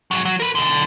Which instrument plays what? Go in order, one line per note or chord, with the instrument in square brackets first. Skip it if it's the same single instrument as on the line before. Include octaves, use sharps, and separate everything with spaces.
[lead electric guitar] G#2 F#3
F#3
A#4 B4
B1 D3